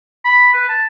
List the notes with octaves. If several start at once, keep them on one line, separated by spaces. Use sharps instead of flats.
B5
B4
A5